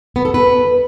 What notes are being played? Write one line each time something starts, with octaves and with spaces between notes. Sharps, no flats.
B3
A4
B4